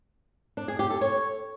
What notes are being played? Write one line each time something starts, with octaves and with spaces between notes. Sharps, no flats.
D4
G#4
G4
A4
C#5